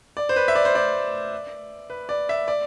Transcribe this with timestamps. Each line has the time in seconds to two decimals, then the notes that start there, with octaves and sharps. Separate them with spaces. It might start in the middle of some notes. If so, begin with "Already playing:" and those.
0.17 D5
0.29 C5
0.36 B4
0.48 E5
0.55 D5
0.65 C5
0.75 D5
1.90 B4
2.09 D5
2.29 E5
2.48 D5